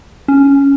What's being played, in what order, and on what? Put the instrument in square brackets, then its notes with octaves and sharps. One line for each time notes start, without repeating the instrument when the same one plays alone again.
[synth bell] C#4